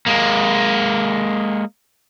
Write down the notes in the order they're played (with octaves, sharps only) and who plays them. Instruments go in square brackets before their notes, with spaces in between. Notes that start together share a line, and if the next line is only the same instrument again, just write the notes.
[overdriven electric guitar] G#3 A#3